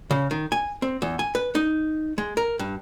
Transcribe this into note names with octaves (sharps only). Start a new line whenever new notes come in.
C#3
D#3
G#5
C4
E2
G#5
B4
D#4
G#3
A#4
G2